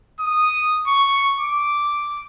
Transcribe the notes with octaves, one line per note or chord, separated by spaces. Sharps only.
D#6
C#6
D6